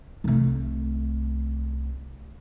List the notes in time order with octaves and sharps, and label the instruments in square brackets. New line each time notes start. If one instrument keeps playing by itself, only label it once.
[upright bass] C2 A3